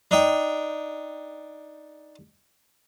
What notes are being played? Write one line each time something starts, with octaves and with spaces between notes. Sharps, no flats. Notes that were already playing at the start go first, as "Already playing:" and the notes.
D4 D#4 G5